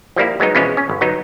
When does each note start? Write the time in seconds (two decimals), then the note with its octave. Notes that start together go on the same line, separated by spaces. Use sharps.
0.16 F3 G3 A#3 E4
0.40 F#3 G#3 B3 D#4
0.55 B2 E3 F3 G#3 B3 C#4
0.77 C#4
0.89 G1
1.01 F#3 B3 D#4